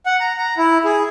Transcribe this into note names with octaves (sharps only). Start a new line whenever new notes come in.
F#5
A#5
A#5
E4
G#4